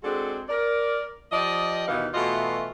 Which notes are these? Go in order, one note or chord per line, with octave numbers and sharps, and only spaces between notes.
G#3 C4 D4 F#4 G#4 A4
A#4 D5
F3 G4 D5 D#5
D#2 B2 E3 B3 D#4 F5
B2 E3 A3 F4 F#4 D#5